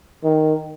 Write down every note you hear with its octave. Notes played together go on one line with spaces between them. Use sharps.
D#3